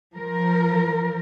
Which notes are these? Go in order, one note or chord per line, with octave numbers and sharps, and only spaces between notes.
F3 A#4